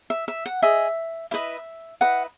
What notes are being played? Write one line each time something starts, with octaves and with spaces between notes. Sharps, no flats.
E5
E5
F#5
G#4 D#5 E5
E4 B4 D#5 E5
E4 B4 D#5 F#5